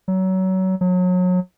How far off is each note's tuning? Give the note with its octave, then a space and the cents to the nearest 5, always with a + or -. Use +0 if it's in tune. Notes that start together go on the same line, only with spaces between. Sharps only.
F#3 +25
F#3 -30